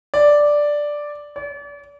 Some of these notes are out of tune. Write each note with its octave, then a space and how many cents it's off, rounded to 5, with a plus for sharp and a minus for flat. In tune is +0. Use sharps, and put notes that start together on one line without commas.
D5 +0
D5 -40